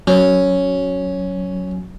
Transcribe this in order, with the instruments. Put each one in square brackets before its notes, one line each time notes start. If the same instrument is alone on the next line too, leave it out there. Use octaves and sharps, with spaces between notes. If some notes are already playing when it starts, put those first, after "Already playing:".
[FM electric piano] F#3 [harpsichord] C#4